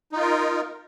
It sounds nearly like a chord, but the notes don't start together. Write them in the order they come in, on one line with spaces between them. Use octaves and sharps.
D#4 F4 A#4